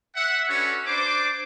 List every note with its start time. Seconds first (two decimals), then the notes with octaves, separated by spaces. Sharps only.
0.16 E5 F#5
0.49 C#4 D4 F#4 A4 B4 C#5
0.86 D4 C5 D6